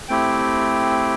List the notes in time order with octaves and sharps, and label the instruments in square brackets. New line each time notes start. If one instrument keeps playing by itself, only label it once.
[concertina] A3 C4 E4 G4 G5